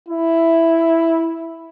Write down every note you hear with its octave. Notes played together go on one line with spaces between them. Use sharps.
E4